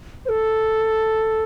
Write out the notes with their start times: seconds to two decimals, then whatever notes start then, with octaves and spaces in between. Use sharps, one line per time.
0.25 C5
0.28 A4